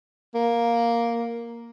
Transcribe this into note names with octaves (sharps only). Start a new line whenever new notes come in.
A#3